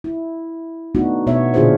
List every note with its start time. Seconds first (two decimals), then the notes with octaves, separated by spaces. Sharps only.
0.04 E4
0.95 A3 B3 D4 D#4 F#4
1.27 B2 B3 C#5 E5
1.54 A#2 D3 D4 F4 G#4 C5